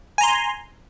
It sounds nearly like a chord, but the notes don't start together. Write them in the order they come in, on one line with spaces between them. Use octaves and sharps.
G#5 A#5 C6